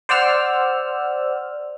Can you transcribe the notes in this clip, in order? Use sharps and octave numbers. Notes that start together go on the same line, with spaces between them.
C5 D5 F#5 E6 F6